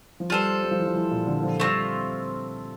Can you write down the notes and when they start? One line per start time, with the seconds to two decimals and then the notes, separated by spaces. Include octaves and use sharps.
0.20 F3
0.30 G3 F4 A4 C5
0.63 G3
0.71 F3
0.79 E3
0.86 F3
0.96 E3
1.11 A#2
1.27 D3
1.43 F3
1.60 G3 A3 C4 F4